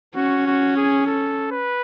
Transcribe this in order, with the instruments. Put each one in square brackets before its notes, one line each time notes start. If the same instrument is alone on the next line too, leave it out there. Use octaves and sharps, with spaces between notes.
[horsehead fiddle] C#4 [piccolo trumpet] F#4
[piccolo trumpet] F#4
G#4
A4
B4